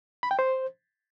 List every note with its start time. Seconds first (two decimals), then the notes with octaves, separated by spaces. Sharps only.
0.23 B5
0.31 G5
0.39 C5